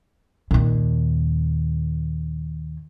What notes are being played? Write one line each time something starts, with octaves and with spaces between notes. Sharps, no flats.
D#2 A#2